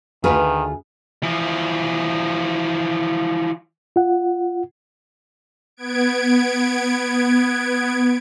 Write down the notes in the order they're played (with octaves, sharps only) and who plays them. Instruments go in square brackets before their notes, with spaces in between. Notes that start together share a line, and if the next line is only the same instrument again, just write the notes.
[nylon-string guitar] D2 G2 G#4 [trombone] D#3 [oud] F4 F#4 B4
[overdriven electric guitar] E3 F3
[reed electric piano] F4 F#5
[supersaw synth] B3 G#6 D7